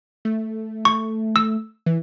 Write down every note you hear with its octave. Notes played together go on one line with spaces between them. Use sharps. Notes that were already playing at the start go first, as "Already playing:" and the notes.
A3
C#6
E6
E3